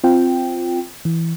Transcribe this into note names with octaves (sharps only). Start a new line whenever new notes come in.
C4 F4 G5
E3